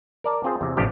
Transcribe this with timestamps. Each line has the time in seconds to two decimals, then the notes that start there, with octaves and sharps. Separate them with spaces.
0.24 A#4 D5 A5
0.44 C4 F4 G#4 C5
0.61 E2 C3
0.77 A1 C3 F3 D4 G4 G5